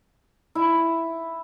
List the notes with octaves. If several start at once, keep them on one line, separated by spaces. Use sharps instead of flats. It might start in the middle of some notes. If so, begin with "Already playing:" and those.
E4